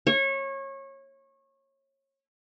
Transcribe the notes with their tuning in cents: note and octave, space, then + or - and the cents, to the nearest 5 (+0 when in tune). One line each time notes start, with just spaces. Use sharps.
C#5 -25